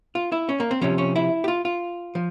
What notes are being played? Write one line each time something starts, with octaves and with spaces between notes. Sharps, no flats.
F4
E4
C#4
A#3
C4
C3 F3 C#4
C#4
E4
G4
F4
F4
F3